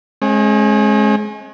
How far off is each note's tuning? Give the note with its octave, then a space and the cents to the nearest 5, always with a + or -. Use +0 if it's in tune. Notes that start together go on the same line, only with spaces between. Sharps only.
G#3 +25 C#4 -45